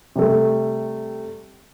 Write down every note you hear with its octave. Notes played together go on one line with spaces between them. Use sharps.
C3 G3 A3